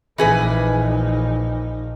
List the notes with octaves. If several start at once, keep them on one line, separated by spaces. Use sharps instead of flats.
A#1 E3 D#4 G#4 B4